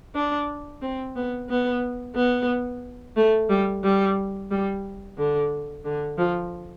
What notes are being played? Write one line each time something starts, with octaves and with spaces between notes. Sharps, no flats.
D4
C4
B3
B3
B3
A3
G3
G3
G3
D3
D3
F3